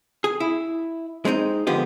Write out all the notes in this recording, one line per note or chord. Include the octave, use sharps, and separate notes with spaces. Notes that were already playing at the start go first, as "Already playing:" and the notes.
G#4
E4
G#3 C4 C#4 D#4
D3 F3 G#3 B3 G4